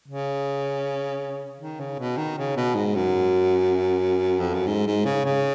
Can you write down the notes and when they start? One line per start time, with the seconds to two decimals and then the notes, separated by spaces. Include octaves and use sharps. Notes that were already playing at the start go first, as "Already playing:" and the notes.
0.08 C#3
1.60 D#3
1.80 C#3
1.99 B2
2.17 D#3
2.38 C#3
2.57 B2
2.75 G#2
2.95 F#2
4.40 F2
4.54 F#2
4.66 G#2
4.86 G#2
5.05 C#3
5.25 C#3